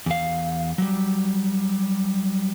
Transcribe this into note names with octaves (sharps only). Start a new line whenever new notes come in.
E2 F5
F#3 G3